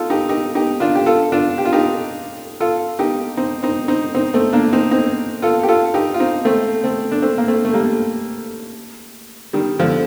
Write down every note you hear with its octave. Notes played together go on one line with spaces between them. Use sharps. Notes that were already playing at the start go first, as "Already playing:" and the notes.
Already playing: D#4 F4 A4
D#4 G4
D#4 G4
D#4 G4
D4 F4
G4
F4 A4
D4 F4
G4
F4
D#4 G4
F4 A4
D#4 G4
C4 D#4
C4 D#4
C4 D#4
C4 D#4
A3 C4
A#3 D4
C4 D#4
C4 D#4
F4 A4
G4
F4 A4
D#4 G4
F4
C4 D#4
A3 C4
A3 C4
D4
A3 C4
A#3
A3 C4
A3
G3 A#3
D#3 G3
D3 F3